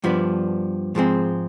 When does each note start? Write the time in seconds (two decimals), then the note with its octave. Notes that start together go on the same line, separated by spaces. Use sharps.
0.04 G2 F3 B3 D4
0.95 G#2 F3 G#3 C4